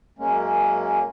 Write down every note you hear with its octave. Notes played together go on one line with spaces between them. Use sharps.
F#2 G#3 A#3 C#4